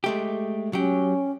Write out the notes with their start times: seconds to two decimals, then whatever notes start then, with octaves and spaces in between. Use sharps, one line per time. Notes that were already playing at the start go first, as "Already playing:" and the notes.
0.04 G#3 A3 G4
0.73 F#3 C#4 G4